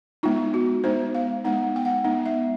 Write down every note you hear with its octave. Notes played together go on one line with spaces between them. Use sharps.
G#3 B3 D#4 F4
F#4
G#3 B3 D#4 C5
F5
G#3 B3 D#4 F#5
G5
F#5
G#3 B3 D#4
E5